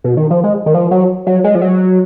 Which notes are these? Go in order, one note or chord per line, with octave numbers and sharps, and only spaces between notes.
B2
D#3
F3
G#3
D#3
F3
F#3
F#3
G#3
F3
F#3